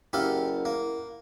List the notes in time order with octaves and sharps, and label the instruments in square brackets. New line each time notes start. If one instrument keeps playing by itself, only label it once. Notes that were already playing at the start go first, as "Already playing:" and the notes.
[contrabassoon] F#1 [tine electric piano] E4 A#4 F#5 [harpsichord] G4 A4 F5
[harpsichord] A#3